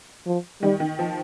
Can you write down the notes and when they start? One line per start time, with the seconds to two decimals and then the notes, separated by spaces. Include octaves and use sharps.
0.26 F3
0.62 D#3 G3
0.80 D#3
0.99 F3